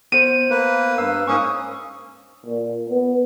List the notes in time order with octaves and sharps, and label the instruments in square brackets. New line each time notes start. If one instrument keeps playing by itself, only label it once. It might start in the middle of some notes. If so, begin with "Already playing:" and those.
[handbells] B3 C5 [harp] D#7
[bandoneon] A#3 B4
[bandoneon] G2 [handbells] F5 E6
[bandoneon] G#2 A#3 C#4 [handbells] C#6 D#6
[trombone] A#2
B3